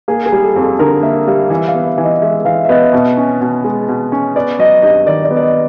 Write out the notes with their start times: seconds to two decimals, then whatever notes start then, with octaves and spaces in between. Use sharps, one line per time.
0.08 A#3 G#4
0.26 G#4
0.32 G3
0.44 A4
0.56 F2
0.62 A4
0.79 D3 A#4
1.03 A#3 E5
1.27 G3 F5
1.50 E3 E5
1.68 F5
1.74 B3
1.87 E5
1.98 E3
2.04 D#5
2.22 G#3 E5
2.45 E3 F5
2.65 E5
2.69 B3 D#5
2.93 B2
3.17 C#4
3.41 B2
3.64 G#3
3.88 B2
4.12 C#4
4.36 B3 D5
4.59 F#3 D#5
4.82 G2 D#5
5.06 D#3 D5
5.24 D5
5.31 B3
5.36 D5
5.42 D#5